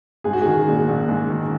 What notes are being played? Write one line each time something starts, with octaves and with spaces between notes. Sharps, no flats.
G#2 G#4
F#4
D#3 G#4
A#1
A#1
G#2
D#3